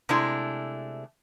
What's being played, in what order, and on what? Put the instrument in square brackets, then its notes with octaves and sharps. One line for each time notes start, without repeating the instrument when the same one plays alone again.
[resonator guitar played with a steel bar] C3 G#3 A3 D4 E4